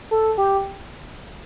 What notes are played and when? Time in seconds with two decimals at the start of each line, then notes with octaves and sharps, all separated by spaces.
0.11 A4
0.38 G4